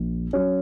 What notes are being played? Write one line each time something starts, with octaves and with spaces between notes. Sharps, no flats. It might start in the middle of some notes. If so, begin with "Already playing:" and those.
Already playing: A#1
F#3 C#4